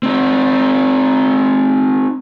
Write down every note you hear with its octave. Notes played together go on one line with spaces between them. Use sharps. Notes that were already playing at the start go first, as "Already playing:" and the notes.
C4 D#4